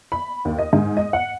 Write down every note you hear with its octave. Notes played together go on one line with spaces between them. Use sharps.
B5
D#2
D#5
G#2
D#5
F#5